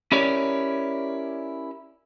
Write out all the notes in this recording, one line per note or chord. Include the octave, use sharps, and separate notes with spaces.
C#4 E4 G4 A#4 C#5 D5